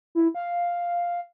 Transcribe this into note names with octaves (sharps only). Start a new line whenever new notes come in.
E4
F5